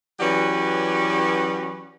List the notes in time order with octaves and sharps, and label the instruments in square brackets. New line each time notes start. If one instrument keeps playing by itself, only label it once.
[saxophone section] E3 F#3 C#4 G4 B4 D5